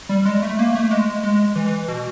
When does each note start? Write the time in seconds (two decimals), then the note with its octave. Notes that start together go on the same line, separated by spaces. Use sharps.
0.09 G3
0.26 G#3
0.42 A3
0.59 A#3
0.75 A3
0.91 G#3
1.23 G#3
1.56 E3
1.66 E3
1.88 B2